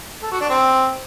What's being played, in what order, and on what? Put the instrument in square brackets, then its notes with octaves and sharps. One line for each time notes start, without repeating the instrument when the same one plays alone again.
[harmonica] A4
F#4
D4
C4